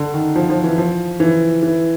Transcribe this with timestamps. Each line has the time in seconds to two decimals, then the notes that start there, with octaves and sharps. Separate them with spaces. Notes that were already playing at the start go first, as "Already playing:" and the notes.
Already playing: D3
0.14 D#3
0.35 F3
0.50 F3
0.64 E3
0.78 F3
1.20 E3
1.63 E3